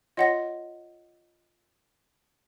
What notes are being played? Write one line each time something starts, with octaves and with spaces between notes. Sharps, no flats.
F4 C#5 D#5 F#5 C6 A#6